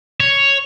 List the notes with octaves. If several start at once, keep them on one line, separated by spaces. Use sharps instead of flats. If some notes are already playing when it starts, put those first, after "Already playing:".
C#5